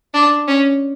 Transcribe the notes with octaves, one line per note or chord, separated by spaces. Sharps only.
D4
C#4